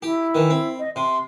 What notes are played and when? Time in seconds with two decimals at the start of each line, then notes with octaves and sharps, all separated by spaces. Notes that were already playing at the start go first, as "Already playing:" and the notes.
0.02 E4 G4
0.35 D#3 E3
0.50 C4
0.79 D#5
0.96 C3 C6